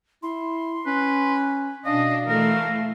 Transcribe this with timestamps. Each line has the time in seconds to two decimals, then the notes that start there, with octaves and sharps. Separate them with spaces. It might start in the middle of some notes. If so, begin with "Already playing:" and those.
0.23 E4 C6
0.86 C#4 B4
1.85 B2 D4 D#5 F5
2.27 E3 A3 A#4